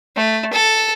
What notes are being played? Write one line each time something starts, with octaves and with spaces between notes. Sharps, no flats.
A3
A4